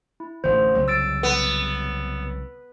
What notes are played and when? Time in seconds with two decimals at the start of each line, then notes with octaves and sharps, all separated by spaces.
0.20 E4
0.44 A1 D2 D#3 C5
0.75 C2 C#3 F#3
0.88 E6 A6 D7
1.23 B3